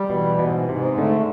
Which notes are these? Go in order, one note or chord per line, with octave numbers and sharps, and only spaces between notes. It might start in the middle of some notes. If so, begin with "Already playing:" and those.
Already playing: G3
B2 E3
G#2 B2
G#2 C3
D3 A3